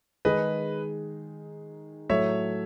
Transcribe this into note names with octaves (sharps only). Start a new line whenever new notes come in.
D#3 G#3 D#4 G#4 B4 D#5
A2 F#3 A3 C#5 E5